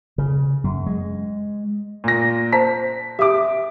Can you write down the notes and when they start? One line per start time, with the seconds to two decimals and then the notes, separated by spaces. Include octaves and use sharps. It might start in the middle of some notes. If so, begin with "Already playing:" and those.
0.18 C#3
0.64 F#2
0.86 G#3
2.04 A#2 A#6
2.53 C5 A5 A#5 B6
3.19 G4 E5 D6 D#6